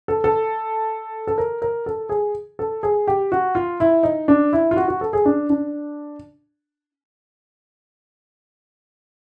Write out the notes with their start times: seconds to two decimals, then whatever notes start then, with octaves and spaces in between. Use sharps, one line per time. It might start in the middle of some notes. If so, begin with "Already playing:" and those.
0.08 A4
0.24 A4
1.27 A4
1.38 A#4
1.62 A#4
1.86 A4
2.09 G#4
2.59 A4
2.83 G#4
3.07 G4
3.32 F#4
3.55 F4
3.80 E4
4.03 D#4
4.28 D4
4.53 E4
4.71 F4
4.77 F#4
4.88 F#4
5.01 A4
5.13 G#4
5.25 D4
5.50 D4